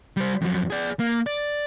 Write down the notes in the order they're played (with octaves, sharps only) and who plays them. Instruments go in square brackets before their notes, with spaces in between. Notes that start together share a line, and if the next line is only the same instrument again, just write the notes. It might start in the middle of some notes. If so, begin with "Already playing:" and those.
[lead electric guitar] G3 C5
F2 F#3
G#4 D5
A#3
D5